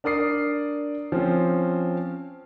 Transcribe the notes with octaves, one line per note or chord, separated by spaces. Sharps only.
D4 A#4 D5 D#6 C7
F3 C4 C#4